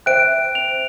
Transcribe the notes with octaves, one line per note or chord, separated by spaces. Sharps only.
C5 E5 G5 F#6 D7
F7